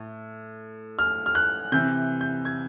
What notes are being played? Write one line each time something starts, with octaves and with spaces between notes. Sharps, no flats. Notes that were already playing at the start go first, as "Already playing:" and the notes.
Already playing: A2
F6
F6
F#6
C3 E3 G6
G6
G#6